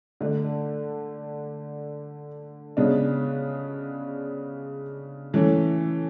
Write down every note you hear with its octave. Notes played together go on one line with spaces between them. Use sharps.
D3 A3 D4
C#3 G#3 B3 D4
E3 A3 C#4